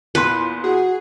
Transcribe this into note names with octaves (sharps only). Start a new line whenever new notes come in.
E2 A#2 B4 C6
F#4 G#4